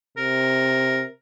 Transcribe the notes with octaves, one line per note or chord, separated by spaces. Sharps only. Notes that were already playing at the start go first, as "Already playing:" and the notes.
C3 A#4